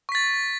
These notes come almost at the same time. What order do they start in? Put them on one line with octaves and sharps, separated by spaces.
C#6 B6 A6